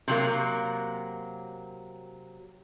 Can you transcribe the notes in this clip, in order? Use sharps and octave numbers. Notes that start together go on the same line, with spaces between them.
C3 F#3 A#3